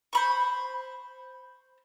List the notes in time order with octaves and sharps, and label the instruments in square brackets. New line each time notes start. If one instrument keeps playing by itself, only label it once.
[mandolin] C5 B5 C#6